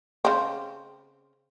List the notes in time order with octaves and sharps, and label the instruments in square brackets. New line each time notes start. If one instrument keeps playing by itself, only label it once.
[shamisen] C#3 C4